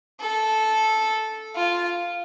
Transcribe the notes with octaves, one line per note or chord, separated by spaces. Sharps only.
A4
F4